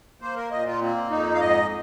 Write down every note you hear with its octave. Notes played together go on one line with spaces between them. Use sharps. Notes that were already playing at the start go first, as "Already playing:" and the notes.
A#3 C5
A#4
A#2 D#5
F4
A#3 C4
F2 D#4
F5
G#2 D#5